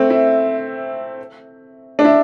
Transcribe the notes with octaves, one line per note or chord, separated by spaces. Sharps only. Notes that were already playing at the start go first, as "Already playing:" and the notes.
Already playing: A3 C4
E4
D4
E4